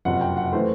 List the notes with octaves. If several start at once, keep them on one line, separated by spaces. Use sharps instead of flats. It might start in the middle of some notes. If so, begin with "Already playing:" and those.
F#1 F2 C3 F#5
G5
F#5
E3 A3 C5